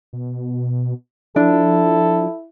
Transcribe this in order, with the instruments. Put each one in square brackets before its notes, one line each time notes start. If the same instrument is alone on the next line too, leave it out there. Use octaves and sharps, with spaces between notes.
[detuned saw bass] B2
[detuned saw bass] F3 [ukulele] D4 [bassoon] E4 [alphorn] A4